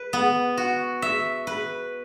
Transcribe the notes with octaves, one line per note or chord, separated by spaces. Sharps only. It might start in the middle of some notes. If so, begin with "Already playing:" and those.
Already playing: B4
B3
F#4
E5
B4